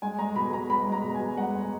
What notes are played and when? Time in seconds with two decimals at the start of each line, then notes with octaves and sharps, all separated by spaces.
0.02 G#3 G#5
0.18 G#3 A#5
0.36 B2 B5
0.52 B2 A#5
0.69 G#3 B5
0.87 G#3
0.92 A#5
1.04 B2
1.14 G#5
1.20 B2
1.37 G#3 F#5
1.55 G#3